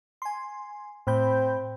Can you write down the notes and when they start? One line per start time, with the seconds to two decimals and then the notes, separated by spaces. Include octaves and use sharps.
0.22 G#5 C6
1.07 A2 C4 B5 G6